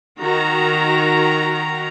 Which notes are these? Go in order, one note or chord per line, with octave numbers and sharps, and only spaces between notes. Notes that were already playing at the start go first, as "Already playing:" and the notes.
D#3 F#4 A#5